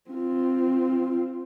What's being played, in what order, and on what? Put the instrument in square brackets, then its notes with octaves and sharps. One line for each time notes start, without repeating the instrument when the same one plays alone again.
[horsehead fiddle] C4 F4